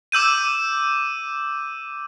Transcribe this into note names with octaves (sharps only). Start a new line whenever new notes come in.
D6 E6 G6 D#7